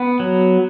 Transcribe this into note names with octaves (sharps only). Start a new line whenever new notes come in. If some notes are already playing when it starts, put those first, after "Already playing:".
Already playing: B3
F#3